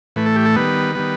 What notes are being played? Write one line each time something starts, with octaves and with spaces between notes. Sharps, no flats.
A2 E3 A3 B4
A4
G4
A4
D#3 G3 B3 B4
D#3 G3 B3